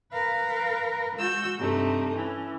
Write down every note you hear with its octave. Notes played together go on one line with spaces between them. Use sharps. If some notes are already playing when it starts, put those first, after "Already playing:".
A#4 B4 F5
G#3 F#4 E6 G6
G2 C3 A3 D#4
E3 C#4